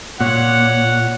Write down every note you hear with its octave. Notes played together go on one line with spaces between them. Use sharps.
A#2 C#5 F#5